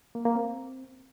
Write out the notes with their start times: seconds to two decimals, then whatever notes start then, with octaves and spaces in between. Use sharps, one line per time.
0.15 A#3
0.25 A#3
0.35 C4